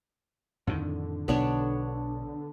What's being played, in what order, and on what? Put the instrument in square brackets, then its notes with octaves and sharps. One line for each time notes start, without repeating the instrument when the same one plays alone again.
[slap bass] F2 A2 D#3 [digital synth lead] D3
[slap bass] B1 [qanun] B3 D4 C#5